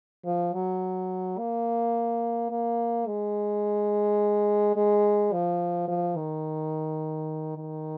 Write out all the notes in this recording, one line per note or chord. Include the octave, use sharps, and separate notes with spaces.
F3
F#3
A#3
A#3
G#3
G#3
F3
F3
D#3
D#3